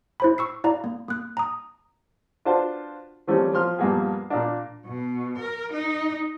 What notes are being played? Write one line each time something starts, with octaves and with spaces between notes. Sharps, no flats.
E4 C5 B5
C#6 E6 C7
E4 D5 F5 A#5
A#3
A#3 F#6
A#5 D#6
D4 F4 F#4 B4 C5 A5
E3 F3 G3 A3 C4 C#4
F3 C6 F6
A#1 G2 A#3 B3 G#4
A#2 A#3 D4
B2
A#4
D#4